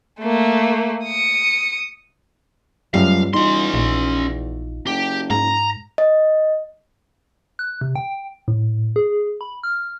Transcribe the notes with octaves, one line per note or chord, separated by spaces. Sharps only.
A3 A#3
D#6 C#7
C#2 F#2 G3 A3 F5
E2 C#4 D#4 F4 C6
A#1
F#1 G4
G#2 A#5
D#5
F#6
C3
G5
A2
G#4
B5
F6